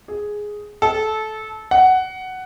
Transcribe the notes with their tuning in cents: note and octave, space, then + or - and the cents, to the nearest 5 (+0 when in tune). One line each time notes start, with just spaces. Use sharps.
G#4 +0
A4 -20
F#5 +10